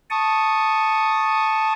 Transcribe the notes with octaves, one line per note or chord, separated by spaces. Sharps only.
A5 C#6 D#6